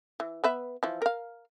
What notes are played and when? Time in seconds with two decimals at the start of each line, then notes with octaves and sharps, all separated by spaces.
0.20 E3
0.44 B3 B4 E5
0.83 E3 F3
1.02 A#4 F5